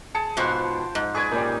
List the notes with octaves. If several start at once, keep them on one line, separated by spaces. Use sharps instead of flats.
G#4 A5 C#7
G#2 B2 F3 G5 C6
G#2
G#4 B4 D5 C#6 G#6
A#2 G3 C#4 D#4